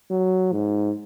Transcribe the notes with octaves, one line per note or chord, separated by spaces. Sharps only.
F#3
G#2